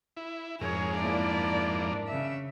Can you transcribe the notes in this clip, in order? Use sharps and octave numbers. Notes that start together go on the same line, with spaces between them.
E4
F2 G#2 G#4 A#4 C#5
A#3 D4 E4 D5
C#3 E5